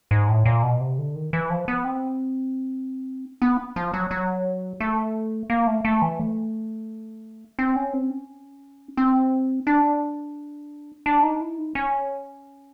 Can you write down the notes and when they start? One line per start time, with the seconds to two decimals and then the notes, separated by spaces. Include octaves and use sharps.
0.11 G#2
0.28 A2
0.45 A#2
0.63 B2
0.81 C3
0.98 D3
1.15 D#3
1.33 E3
1.50 F3
1.68 B3
1.85 C4
3.42 B3
3.76 F3
3.94 F#3
4.11 F#3
4.80 A3
5.50 A#3
5.67 A3
5.85 A3
6.02 E3
6.19 A3
7.59 C4
7.76 C#4
7.93 C4
8.10 C#4
8.97 C4
9.67 D4
11.06 D4
11.23 D#4
11.41 E4
11.58 D#4
11.75 C#4